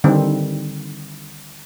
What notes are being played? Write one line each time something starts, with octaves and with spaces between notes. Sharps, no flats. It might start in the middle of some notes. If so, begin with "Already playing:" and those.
D3 D#3 G3 C4